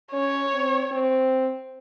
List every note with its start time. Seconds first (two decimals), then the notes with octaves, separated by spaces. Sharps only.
0.13 C#4 C#5
0.54 C4
0.92 C4